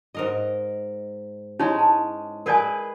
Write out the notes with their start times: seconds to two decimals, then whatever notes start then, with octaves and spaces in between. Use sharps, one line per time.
0.15 G#2 A#4 D#5
1.59 G#3 C#4 D#4 E4 C#5
1.79 A5
2.46 G#4 A#4 B4 D5 G#5